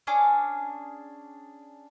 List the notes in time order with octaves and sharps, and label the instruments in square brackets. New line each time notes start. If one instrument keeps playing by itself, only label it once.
[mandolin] C#4 D4 G#4 D6